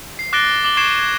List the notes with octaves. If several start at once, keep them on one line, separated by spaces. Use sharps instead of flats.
C7
D6 F#6 A6 A#6 D7 G7
G7
D6 F#7 G7
C#6 G#6 C7 D7 E7
G#6